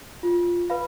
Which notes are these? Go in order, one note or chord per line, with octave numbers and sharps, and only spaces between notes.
F4
B4 F5 B5